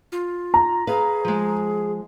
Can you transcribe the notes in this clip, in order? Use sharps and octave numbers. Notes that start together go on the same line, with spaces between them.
F4
A#5
G#4 B4 F5
F3 G#3